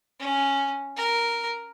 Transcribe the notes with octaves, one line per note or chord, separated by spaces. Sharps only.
C#4
A#4